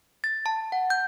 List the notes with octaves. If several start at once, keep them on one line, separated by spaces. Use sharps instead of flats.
A6
A5
F#5
G6